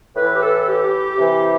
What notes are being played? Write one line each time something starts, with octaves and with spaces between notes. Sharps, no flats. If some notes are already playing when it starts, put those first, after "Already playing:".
A2 E3 B4
G4
A4
A4
G4
C3 E3